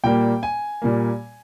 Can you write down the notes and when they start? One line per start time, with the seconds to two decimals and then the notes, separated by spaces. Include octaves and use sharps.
0.04 A#2 G3 A#3 G5
0.43 G#5
0.82 A#2 G3 A#3